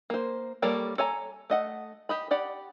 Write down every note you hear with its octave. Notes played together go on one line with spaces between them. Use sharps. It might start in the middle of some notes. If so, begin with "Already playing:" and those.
A#3 C5
G3 A#3 A4 A#4 C#5
A4 C#5 G#5 A#5
A3 D#5 F#5
G4 D#5 B5
G4 D5 F#5 B5